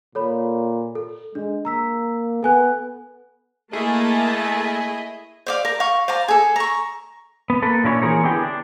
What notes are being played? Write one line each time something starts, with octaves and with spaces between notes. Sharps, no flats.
A#2 A4 C#5 B5
A4
G#3 D4
A#3 A#5 E6 B6
B3 A4 G#5 F#6
A3 A#3 E4 G#4 D#5 A5
C5 D5 F5
A#4
F5 C#6
C5 D5 F5 A#5
G#4 A4
A#5 C#6
B3
A#3 A4 B4
A#2 C#4 D4 E4 B4 C#5
E3 A#3 G#4 A#4 C5 C#5
D3 B3 E4 G4 G#4 G5
D4